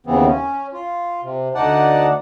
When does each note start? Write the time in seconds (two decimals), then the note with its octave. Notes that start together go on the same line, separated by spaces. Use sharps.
0.06 D#2 C#3 E3 B3 C4
0.27 C#4
0.73 F4
1.23 C3
1.55 D2 D#4 D5 F#5 A5